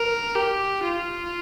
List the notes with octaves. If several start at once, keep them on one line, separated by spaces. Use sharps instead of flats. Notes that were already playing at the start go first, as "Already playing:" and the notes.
Already playing: A#4
G4
F4